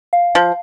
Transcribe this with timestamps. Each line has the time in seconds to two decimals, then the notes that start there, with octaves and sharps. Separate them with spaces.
0.13 F5
0.35 F3